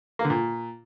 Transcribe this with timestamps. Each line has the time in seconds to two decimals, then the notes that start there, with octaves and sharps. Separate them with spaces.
0.19 A#3
0.25 D3
0.30 A#2